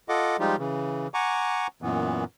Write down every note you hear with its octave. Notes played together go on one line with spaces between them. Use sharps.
F4 A4 D#5 F#5 D6
F3 G3 G#3 D#4 F4 G4
C#3 E3
F#5 G#5 A#5 C#6 D6
F#2 A#2 E3 B3